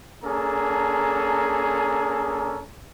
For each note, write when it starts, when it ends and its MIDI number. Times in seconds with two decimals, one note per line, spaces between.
0.24 2.63 58
0.24 2.63 61
0.24 2.63 62
0.24 2.63 68
0.24 2.63 69
0.24 2.63 82